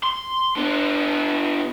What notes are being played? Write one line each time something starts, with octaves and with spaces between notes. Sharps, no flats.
C6
D3 B3